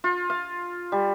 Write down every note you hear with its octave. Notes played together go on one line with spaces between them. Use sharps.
F4
F5
G3